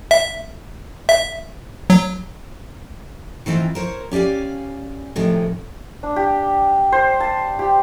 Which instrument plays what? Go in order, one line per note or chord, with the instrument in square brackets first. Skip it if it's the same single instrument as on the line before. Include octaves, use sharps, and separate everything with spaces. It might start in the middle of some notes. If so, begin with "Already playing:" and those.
[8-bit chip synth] E5
E5
F#3
[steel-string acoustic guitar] D#3 E3 C4 F4
A#4 C5 C#5
C#4 G4 D5 F5 G#5
A2 C3 D#3 F3 G#3
[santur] D4
G4
C5
A5
G4